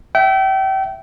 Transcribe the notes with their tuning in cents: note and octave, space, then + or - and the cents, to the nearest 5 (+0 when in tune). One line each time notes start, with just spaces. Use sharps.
E5 +0 G5 -35